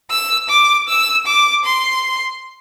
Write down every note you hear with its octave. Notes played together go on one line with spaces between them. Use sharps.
E6
D6
E6
D6
C6